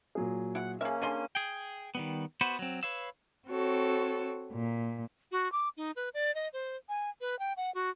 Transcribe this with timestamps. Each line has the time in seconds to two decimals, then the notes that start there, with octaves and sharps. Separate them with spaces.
0.15 A#2 F#3 G#4
0.55 E4 F#5
0.81 A#3 C#4 G#4 E5
1.02 D3 G#4 C6 D#7
1.35 G#4 G5
1.95 D#3 G3 B3
2.41 B3 F#4 B4 C5
2.59 F#3 C4
2.83 B4 C#5 F5 E6
3.47 C4 F#4 A4 C#5
4.52 A#2
5.32 F#4
5.52 D6
5.77 D#4
5.96 B4
6.14 D5
6.35 D#5
6.53 C5
6.89 G#5
7.21 B4
7.39 G5
7.57 F#5
7.75 F#4